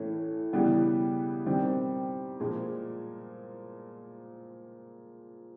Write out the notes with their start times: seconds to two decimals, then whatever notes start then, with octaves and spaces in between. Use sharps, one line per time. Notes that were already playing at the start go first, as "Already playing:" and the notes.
Already playing: A2 E3 A3 C#4
0.53 C#3 E3 G3 B3
1.46 D#3 G3 C4
2.40 A#2 F3 G#3